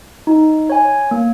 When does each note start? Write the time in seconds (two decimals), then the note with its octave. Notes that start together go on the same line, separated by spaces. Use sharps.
0.27 D#4
0.70 C#5 G#5
1.11 A#3